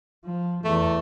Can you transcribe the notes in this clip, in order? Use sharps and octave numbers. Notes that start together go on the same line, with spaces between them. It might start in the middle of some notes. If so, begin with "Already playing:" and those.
F3
E2 A3